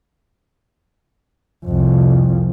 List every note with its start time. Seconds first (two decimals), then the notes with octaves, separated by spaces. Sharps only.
1.65 C2 F2